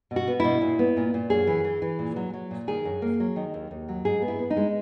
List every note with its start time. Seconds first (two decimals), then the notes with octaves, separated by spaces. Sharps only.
0.11 B2
0.16 F#4
0.27 B3
0.40 B2 E4
0.61 A#2
0.79 B3
0.97 A#2
1.14 A#2
1.30 F#2 G#4
1.47 E3
1.64 E3
1.82 E3
1.99 A#2
2.16 F#3
2.33 F#3
2.51 A#2
2.67 D#3 G#4
2.85 F#2
3.02 A#3
3.20 F#3
3.36 D#3
3.54 D#2
3.71 D#2
3.89 F#3
4.05 G#2 G#4
4.22 B3
4.28 E4
4.39 B3
4.50 D#4
4.57 G#3